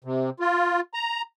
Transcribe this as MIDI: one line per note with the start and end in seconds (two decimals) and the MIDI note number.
0.05 0.30 48
0.40 0.80 65
0.94 1.22 82